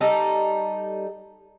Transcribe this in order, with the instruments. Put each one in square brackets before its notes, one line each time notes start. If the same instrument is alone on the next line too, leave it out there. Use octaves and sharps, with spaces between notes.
[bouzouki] G3 D#4 A4